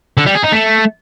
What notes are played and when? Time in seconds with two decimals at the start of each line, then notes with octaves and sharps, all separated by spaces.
0.18 D3
0.26 G3
0.35 G#4
0.44 D#4
0.53 A3